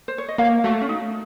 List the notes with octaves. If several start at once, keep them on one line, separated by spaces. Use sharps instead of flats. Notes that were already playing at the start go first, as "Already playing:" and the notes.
C5
C#5
D#5
A#3 C#5 F5
A3 F#4
C#4
D#4